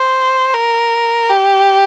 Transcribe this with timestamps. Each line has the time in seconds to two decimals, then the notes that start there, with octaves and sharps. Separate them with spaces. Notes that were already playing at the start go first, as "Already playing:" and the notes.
Already playing: C5
0.54 A#4
1.29 G4